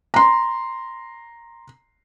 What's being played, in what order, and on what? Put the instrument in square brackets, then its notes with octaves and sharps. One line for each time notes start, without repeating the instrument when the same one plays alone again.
[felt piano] A#5 C6